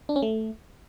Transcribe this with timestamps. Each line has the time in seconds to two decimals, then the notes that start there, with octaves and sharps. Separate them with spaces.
0.09 D4
0.16 C#4
0.22 A3